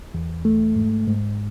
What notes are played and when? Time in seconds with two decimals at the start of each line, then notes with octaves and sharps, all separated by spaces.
0.14 E2
0.45 A3
0.75 G#2
1.07 G#2